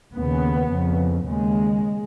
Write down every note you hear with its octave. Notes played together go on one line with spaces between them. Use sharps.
D#2 C#3 B3
F2 C#3
D#2 C#3 G#3